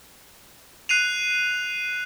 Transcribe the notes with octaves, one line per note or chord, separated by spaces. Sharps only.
F#6 C7 D#7 F7